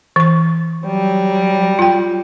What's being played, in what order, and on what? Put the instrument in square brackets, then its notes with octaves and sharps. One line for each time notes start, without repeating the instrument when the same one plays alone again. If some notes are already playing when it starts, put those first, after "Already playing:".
[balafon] E3 C#6
[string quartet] F#3 G3
[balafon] F4 G5